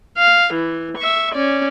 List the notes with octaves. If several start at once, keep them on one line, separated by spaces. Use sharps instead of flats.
F5
E3
E5 C#6
C#4 D5